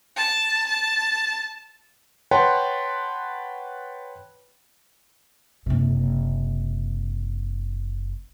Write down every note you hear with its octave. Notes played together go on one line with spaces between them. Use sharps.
A5
A5
B4 C#5 F#5 G5 A5 C6
F#1 C3